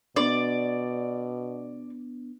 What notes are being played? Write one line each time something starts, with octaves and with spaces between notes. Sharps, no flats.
B2 B3 D4 D5